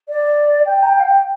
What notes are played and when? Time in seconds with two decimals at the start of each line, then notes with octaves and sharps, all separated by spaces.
0.09 D5
0.65 G5
0.82 A#5
0.86 G5
0.99 F5
1.03 G5